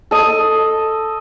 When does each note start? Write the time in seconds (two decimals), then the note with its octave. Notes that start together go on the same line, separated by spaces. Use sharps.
0.11 A4 D#5